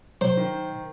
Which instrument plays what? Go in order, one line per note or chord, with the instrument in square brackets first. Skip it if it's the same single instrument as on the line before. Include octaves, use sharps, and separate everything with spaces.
[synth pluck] F#3 [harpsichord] C5
[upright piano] D#3